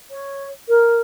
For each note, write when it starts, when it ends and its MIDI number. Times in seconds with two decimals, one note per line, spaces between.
0.11 0.47 73
0.68 1.02 70